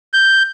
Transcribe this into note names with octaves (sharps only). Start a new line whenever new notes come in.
G6